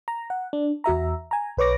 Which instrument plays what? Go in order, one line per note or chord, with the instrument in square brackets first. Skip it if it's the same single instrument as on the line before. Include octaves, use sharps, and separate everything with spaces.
[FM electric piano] A#5
F#5
D4
E2 F#4 E5 A#5
G#5 A#5
B1 B4 C#5 D6 A#6